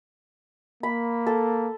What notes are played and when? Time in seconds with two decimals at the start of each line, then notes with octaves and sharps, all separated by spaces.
0.83 A#3 B5
1.27 A4